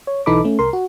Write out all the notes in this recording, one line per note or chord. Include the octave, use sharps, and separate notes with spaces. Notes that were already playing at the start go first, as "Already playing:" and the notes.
C#5
B1 E3 D#4 A4 B5 D6
A3 C#4
C2 A#4 C6
F#4